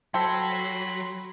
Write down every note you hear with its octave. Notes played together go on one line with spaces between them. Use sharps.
F#3 A4 C5 G5 B5 C6